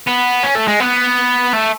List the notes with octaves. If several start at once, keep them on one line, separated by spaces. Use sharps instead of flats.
B3
C#4
A3
G#3
B3
A3